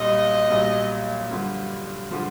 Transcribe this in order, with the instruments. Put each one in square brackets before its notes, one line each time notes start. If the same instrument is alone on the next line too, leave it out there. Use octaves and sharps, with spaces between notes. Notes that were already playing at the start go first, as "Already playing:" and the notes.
Already playing: [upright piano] B1 A#2 G3 [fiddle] D#5
[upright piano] B1 A#2 G3
G2 D3 F3
D3 F3